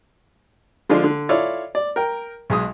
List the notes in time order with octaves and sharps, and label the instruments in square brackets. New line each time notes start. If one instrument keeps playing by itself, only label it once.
[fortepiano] D3 F3 G#3 D4 F4
D3
E4 F4 A4 C#5 D5
D5
A#4 G5
B1 G#3 D#6